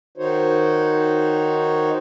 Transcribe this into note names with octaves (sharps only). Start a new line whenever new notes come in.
D#3 D#4 F#4 C5 C#5